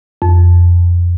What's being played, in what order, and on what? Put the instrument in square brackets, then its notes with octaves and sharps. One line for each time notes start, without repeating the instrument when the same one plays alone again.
[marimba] F2